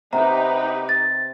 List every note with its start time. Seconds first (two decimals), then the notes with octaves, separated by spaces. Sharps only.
0.13 C3 D#4 G4 B4 F#5 A#5
0.89 A6